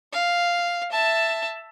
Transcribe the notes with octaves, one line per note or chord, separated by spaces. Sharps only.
F5
E5 A5